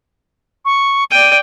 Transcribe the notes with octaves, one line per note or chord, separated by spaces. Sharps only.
C#6
D5 G5 D#7